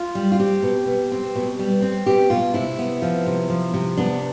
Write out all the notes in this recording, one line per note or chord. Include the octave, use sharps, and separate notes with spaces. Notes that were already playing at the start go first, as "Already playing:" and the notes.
Already playing: F4
G3
F4
C4 G4
B2
B2
C4
B2
G3
C4
B2 G4
B2 F4
C3 E4
B3
F3
C3
F3
C3
B3 D4